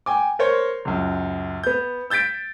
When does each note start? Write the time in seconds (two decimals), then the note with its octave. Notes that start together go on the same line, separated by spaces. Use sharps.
0.06 G5 G#5 D6
0.39 A#4 C5 C#5
0.85 C#2 F#2
1.64 B3 G6
2.10 E6 G6 A6 B6 D7